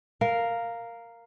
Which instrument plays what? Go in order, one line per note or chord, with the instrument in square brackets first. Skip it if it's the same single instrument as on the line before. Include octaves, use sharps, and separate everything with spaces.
[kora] A#4 F5